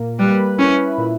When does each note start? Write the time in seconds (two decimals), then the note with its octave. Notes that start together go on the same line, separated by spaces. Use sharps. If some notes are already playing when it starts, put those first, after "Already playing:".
Already playing: A#2 A#3
0.19 G3 B4
0.58 C#4 E4
0.98 A#2